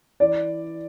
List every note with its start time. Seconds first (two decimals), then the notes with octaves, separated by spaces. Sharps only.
0.20 E3 D5